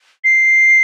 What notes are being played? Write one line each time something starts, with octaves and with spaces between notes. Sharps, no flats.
C7